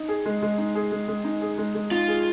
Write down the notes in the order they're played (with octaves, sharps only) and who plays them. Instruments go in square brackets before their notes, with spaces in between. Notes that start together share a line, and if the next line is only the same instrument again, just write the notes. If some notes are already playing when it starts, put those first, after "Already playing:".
Already playing: [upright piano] D#4
G#4
G#3
G#3
D#4
G#4
G#3
G#3
D#4
G#4
G#3
G#3
[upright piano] D#4 [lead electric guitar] F4
[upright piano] G#4